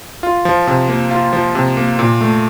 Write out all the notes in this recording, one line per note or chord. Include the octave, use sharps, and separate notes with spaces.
F4
F3
C3
A#3
F4
F3
C3
A#3
A#2
A3